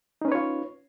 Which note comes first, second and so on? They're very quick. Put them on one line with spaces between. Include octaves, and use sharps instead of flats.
D#4 C#4 B4 C#5 F4